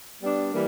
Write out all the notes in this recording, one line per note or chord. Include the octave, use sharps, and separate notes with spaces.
G3 B3 D4
E3 G3 A#3